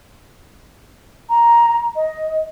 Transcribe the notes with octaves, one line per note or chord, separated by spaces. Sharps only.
A#5
D#5